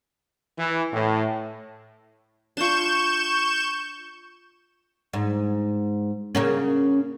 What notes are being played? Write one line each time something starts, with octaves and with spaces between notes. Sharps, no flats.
E3
A2
D4 F4 C#6 G6 E7
G#2
C#3 A#3 C#4